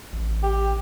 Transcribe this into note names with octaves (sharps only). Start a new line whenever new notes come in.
A1
G4